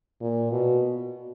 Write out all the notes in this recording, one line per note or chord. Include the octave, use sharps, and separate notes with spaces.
A#2
B2